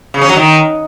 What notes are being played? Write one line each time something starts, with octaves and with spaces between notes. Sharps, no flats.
C#3
C#4
F#3
D#3